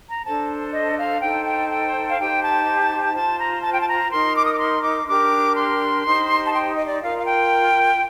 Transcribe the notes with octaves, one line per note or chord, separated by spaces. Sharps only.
A#5
D4 A4 C5 A5
D#5
F5
D#4 A4 C5 G5
G5
G5
F5
D#4 G4 C5 G5
A5
F4 C5 A5
A#5
A5
G5
A5
A#5
D#4 A#4 C6
D6
D#6
D6
C6
D6
D4 G4 A#4 D6
C6
D#4 G4 C5
A5
G5
D#5
D5
F4 A#4 F5
F5
G5